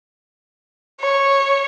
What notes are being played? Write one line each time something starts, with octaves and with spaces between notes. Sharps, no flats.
C#5